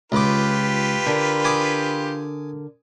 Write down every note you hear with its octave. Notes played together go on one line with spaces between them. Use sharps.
C#2 F4 G4 B4 D6
D3 A#4
G#5 D6 D#6